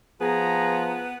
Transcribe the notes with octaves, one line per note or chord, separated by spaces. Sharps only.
F3 B3 G#4 A#5